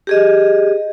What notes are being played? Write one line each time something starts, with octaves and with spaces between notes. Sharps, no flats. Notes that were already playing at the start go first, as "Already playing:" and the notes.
G4 G#4 D#5